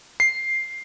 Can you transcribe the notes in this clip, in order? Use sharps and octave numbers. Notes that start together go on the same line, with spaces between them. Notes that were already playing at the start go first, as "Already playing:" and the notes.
C7